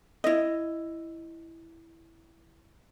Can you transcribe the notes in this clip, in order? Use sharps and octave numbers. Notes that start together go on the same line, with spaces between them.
E4 D#5